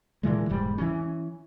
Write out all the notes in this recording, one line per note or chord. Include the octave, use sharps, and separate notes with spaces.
A#2 D3 E3 G#3
E1 G#2 G3
E3 C#4